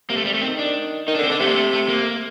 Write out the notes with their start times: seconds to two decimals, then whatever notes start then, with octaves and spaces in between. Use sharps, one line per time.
0.09 C3 A#3
0.17 A3
0.25 C3 G3
0.34 A3
0.42 D#3 C4
0.59 D4
1.07 D#3 D#4
1.15 D4
1.18 D3
1.23 C4
1.29 D3 D4
1.40 C3 A3
1.48 A#3
1.54 A3
1.73 A3
1.89 A#3
2.06 C3